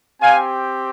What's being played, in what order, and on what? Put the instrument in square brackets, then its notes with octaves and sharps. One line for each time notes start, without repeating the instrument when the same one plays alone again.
[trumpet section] C4 G4 F5 G#5